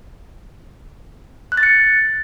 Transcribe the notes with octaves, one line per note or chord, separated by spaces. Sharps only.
F#6
A6
C#7